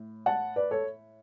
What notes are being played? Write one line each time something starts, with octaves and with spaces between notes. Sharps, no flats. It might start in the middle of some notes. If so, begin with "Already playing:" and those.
Already playing: A2
F#5 A5
B4 D5
A4 C#5